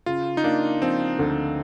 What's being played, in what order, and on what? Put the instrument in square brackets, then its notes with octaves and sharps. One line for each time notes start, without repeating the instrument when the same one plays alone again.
[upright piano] C#3 [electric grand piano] F4
[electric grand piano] D#4
[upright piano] A#3 [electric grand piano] D4
[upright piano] F3 [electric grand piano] C4
[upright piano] D2